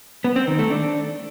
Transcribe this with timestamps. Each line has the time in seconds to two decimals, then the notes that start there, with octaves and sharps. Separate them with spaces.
0.24 B3
0.36 C4
0.47 D#3
0.59 A3
0.70 D4